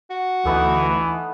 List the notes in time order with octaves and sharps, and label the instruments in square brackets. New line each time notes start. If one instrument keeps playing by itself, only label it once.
[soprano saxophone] F#4
[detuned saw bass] D2 [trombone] E3 [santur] A3 B3 D#4